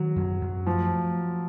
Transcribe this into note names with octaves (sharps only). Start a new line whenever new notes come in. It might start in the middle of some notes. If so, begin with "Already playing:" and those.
Already playing: D#3 F#3
F#2
F#2
F3 A3